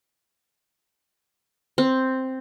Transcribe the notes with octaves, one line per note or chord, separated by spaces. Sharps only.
C4